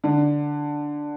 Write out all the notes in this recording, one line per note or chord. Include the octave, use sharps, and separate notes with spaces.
D3